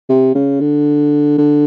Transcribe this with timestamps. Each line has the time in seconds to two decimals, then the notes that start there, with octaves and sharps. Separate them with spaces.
0.09 C3
0.34 C#3
0.60 D3
1.38 D3